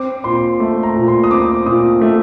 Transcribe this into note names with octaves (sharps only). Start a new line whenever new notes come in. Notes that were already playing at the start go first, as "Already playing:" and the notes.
Already playing: C4 D6
A#2 C6
A3
A#5
A#2
C6
D#6
C4 D6
A#2 D#6
A3